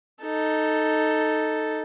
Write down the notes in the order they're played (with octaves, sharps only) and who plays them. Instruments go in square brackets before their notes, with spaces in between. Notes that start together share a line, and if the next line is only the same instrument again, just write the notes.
[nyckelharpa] D#4 A4